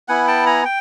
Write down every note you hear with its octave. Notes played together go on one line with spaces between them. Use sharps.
B3 E4 F#5 G#5
G5 A5
G#5 A#5
G5